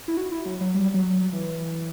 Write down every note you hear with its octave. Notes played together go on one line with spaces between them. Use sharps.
E4
F#4
E4
F#3
F#3
G3
F#3
F#3
E3